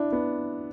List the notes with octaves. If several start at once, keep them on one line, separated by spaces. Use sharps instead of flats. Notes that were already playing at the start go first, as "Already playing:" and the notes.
Already playing: D4 E4
B3